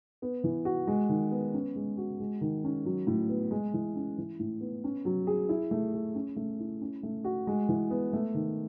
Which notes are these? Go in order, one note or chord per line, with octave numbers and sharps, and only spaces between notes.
B3
E3
F#4
G#3
D#3
B3
C#4
G#3
F#4
G#3
D#3
C#4
F#3
A2
B3
G#3
E3
C#4
E3
A2
B3
C#4
F#3
G#4
E4
A3
G#4
C#4
A3
E4
C#4
A3
F#4
G#3
E3
B3
A3
D#3